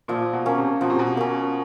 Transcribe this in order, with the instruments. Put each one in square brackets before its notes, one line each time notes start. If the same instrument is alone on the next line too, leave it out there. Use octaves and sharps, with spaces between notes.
[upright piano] A#2 [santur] F3
[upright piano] B2
[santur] A#3 C#4
[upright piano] C3
[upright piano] B2 [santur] F3
[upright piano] C3
B2
[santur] A#3 C#4